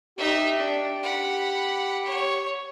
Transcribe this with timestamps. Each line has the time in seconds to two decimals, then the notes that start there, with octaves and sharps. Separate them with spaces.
0.18 D#4 G4 E5
0.58 D4
1.03 F#5 B5
2.05 C#5